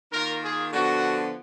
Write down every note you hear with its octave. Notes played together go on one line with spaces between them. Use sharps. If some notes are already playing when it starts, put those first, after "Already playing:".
D#3 A#3 F4 A#4
G#4
D3 F3 B3 F#4